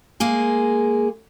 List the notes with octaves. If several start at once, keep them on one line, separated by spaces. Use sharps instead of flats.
G#3 A#3 G#4